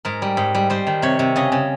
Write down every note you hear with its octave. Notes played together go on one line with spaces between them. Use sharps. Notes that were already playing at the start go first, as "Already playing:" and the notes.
G#2 A#4
G3
G#2
G3
G3 C5
D#3
C3 C#5
C3
C#3 D#5
C#3